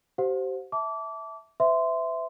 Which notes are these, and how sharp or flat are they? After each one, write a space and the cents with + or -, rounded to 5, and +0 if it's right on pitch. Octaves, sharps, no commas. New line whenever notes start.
G4 -35 C5 +0 F5 +45
E5 -10 A5 +0 D6 -25
B4 +45 E5 +0 C6 -15